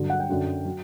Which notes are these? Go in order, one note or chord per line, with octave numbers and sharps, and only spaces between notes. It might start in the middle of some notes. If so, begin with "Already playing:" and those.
Already playing: G2 D3 F#3
F#5
G5
F#2 D3 F#3
F#3